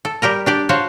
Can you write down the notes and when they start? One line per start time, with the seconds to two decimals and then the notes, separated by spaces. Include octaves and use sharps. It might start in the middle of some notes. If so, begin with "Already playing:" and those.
0.05 A4
0.22 G3 G4 A#4 A#5
0.46 D4 G4 D5
0.69 F4 F#4 C5 C#5 A5